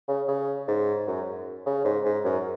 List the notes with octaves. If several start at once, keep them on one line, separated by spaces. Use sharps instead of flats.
C#3
C#3
G#2
F#2
C#3
G#2
G#2
F#2